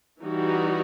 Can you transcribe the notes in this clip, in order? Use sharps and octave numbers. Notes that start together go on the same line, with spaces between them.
E3 G3 D#4 F#4